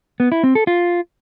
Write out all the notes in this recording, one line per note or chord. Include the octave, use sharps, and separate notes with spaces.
B3
E4
C4
A4
F4